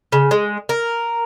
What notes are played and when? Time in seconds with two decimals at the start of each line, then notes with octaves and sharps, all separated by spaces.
0.12 C#3
0.31 G#3
0.69 A#4